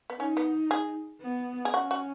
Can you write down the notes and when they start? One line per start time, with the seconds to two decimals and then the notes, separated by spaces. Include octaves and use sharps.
0.10 B3
0.20 C#4 D#4
0.37 B3
0.71 G#4
1.22 B3
1.65 G#4
1.74 C#4 F#4
1.91 F#4